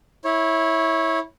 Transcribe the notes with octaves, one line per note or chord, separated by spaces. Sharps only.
E4 C#5